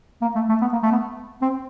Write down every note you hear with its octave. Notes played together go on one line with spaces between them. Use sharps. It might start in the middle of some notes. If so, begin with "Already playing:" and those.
A#3
A3
A3
B3
A#3
A3
B3
C4